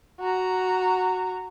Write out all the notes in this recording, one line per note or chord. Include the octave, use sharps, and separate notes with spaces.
F#4 A#5